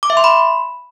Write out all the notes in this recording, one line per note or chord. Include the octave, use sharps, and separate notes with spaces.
D6
E5
C6
B5